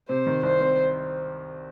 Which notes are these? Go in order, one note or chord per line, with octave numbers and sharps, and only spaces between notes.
C3 C5
D#3
C2 C5
C4